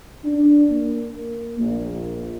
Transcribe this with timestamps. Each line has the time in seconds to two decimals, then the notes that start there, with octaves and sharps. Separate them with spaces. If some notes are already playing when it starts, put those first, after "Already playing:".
0.25 D4
0.71 A#3
1.60 A#1